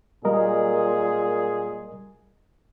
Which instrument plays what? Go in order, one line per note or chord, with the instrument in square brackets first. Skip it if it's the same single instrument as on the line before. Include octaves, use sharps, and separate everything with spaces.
[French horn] A#2 [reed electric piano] G3 A#4 D#5 [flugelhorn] G#4